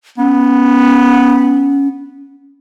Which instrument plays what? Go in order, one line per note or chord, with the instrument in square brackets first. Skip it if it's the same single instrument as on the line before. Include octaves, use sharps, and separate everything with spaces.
[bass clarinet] B3 [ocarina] C#4